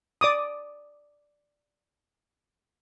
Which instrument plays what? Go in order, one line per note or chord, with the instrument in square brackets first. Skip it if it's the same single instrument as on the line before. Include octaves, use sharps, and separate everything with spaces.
[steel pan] D5 D6 D#6